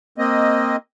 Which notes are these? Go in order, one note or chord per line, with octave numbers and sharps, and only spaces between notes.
A#3 C4 D#5